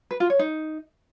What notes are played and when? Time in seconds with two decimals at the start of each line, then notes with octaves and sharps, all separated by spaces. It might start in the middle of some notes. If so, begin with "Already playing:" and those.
0.11 B4
0.20 F4
0.30 C#5
0.39 D#4